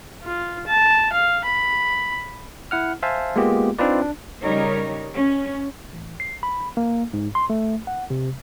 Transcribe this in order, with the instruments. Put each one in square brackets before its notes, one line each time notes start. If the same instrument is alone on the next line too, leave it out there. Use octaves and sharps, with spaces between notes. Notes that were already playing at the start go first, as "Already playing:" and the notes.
[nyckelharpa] F4
A5
F5
B5
[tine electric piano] E4 F#5 F6
C5 E5 F5 G#5 A5
G#3 A#3 B3 F4 G4 G#4
C4 D4 D#4 F4 B4 D5
D4
[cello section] C#3 G3 D#4 A#4 C#5
C#4
[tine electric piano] A1
C7
B5
A#3
G#2
C6
A3
F#5
C3